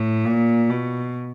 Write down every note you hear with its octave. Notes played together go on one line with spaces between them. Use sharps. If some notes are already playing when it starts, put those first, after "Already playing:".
Already playing: A2
A#2
B2